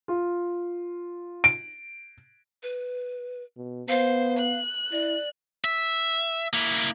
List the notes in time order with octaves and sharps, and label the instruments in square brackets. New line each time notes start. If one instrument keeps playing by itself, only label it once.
[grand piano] F4
[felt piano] D7
[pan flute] B4
[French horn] B2
[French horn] B3 [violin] C5 [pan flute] F5
[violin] F#6
[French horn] E4 [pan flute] D5
[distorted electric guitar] E5
A#3 E4